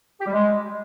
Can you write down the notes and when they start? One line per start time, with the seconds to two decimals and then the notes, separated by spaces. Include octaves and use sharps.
0.20 G4
0.26 G3
0.32 G#3